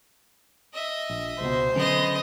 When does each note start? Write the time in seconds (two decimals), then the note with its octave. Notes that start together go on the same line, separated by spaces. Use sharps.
0.73 D#5 E5
1.10 A#1
1.41 C#2 B2 C5
1.76 D3 F#3 B3 C#4 D#5